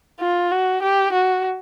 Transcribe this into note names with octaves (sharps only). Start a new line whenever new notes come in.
F4
F#4
G4
F#4